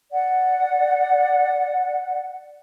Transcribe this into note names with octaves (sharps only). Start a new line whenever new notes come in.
D5 F#5